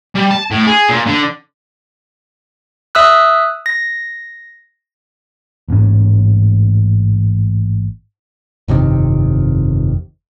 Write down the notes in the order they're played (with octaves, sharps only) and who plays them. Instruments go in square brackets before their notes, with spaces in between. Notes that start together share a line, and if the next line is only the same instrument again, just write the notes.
[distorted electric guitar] G3
A5
A2
G#4
A#2
D3
[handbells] E5 D#6 E6 F#6
A#6
[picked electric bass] A1 G#2 A#3 C#4
G1 F2 C3 D#3